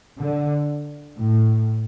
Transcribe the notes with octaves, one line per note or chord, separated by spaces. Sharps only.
D3
A2